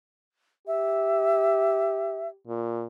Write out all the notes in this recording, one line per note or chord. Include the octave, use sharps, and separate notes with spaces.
G4 E5
A#2